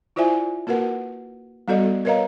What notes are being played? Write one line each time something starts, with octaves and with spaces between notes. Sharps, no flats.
E4 F4 C5 D5 E5 G#5
A#3 F#4 A#4 B4 F#5
G3 B3 F#4 A4 D5 D#5
A#4 B4 C#5 D#5 F5 A#5